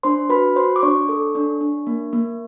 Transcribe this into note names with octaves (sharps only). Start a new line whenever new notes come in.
D4 C5 C6
F#4 B4 B5
F#4 C5 C6
D6
D4 C#5 C#6
A4
D4
D4
A#3
A#3